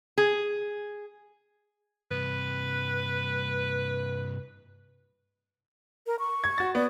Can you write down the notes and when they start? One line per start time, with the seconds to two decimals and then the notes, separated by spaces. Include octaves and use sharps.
0.18 G#4
2.11 G2 C3 B4
6.07 A#4
6.19 C#6
6.44 G#6
6.58 F#4 A6
6.75 B3 D5